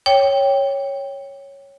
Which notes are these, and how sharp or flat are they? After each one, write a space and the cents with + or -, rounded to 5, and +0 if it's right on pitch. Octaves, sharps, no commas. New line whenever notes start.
C#5 +0 G5 +0